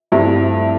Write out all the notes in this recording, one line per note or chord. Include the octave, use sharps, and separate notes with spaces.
G2 F3 A3 C4 E4